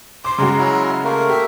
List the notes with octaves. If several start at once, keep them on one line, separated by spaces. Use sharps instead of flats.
C6 D6
C#3 G#3 F#4 A#5
F#3 E4
A3 A#3 A#4
G4 E5